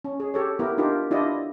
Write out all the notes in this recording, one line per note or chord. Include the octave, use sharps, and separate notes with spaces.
C#4
G#4
G4 A4 C#5
B3 E4 G4 A#4
D4 D#4 F4 G4 A#4
D4 E4 F4 G4 D5 D#5